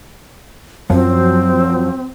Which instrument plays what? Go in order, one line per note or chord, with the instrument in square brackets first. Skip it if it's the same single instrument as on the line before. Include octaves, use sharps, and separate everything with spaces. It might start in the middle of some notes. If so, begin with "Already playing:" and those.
[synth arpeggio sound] F#2 F3 F#3 [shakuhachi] C4